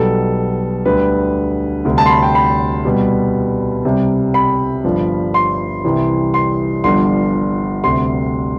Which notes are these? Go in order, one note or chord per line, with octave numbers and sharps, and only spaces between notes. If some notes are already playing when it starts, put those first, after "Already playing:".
Already playing: B1 B2 G3 A4
D2 D3 G3 B4
D2 C3 G3
A5
C6
B5
G5
B5
C2 B2 G3
C2 C3 G3
B5
G1 G2 F3
C6
C2 C3 E3 G3
C6
G1 G2 F3 C6
D2 C3 G3 C6